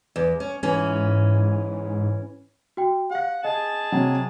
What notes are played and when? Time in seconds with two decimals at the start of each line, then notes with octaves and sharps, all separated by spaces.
0.16 E2
0.40 C#4
0.63 G#2 E3 C#4
2.77 F#4 G5
3.11 G4 F5 F#5
3.45 G#4 D#5 A5
3.92 C3 F#3